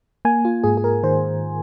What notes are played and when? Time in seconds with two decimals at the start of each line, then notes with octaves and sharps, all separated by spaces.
0.25 A#3 G#5
0.45 F4
0.64 G#2 G#4
0.77 G#4
0.84 A#4
1.03 D#3 C5